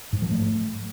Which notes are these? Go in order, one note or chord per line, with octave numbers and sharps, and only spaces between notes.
G#2
F3
A3